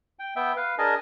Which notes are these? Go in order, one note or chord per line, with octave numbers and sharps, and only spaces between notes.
G5
B3 E5 G5
B4 F5
D4 G#4 A#4 D#5 G#5 A5